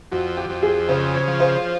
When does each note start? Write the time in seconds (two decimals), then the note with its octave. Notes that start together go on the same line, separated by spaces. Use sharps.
0.12 F2 F#4
0.37 G4
0.49 F2
0.63 G#4
0.89 C#3 C5
1.15 C#5
1.28 F3
1.40 C5